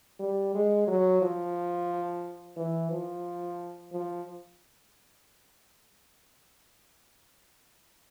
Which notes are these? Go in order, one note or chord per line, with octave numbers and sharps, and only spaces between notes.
G3
G#3
F#3
F3
E3
F3
F3